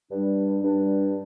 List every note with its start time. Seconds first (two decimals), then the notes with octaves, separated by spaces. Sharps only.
0.11 G2 G3 D4
0.63 G2 G3 D4